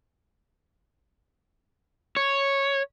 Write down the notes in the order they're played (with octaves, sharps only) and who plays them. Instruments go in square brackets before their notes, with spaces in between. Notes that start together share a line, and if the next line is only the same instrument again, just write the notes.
[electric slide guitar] C#5